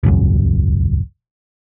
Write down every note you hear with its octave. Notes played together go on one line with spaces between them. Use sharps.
D#1 G#1 C#2 F#2